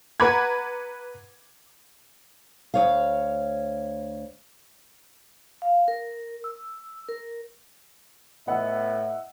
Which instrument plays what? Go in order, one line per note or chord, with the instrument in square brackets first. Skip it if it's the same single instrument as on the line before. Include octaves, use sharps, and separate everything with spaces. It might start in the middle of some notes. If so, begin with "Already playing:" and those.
[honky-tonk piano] B4 F#5 A#5 B5 D6 G#6
[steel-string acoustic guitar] D2 C#5 F5
[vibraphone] F5
A#4
E6
A#4
[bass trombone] A2 [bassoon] B3 [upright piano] D#5 F#5 E6 [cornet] E5